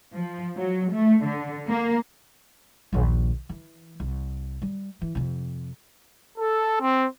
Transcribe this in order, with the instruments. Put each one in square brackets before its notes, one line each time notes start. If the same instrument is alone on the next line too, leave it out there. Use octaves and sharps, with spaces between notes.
[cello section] F3
F#3
A3
D3
A#3
[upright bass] A#1 D#2
E3
C2
G3
E3
F2 C3
[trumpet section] A4
C4